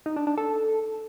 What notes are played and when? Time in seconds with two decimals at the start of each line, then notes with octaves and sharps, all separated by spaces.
0.06 D#4
0.16 D4
0.27 D4
0.37 A4